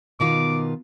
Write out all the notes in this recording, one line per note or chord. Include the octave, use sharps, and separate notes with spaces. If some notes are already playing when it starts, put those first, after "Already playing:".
B2 D#3 F4 D6